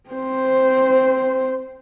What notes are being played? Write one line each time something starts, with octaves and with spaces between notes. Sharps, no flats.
C4 C5